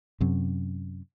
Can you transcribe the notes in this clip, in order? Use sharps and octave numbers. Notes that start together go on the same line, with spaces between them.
F#2 C3